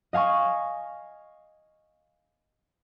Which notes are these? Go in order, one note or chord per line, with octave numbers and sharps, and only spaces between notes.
D#5 F5 G#5 C#6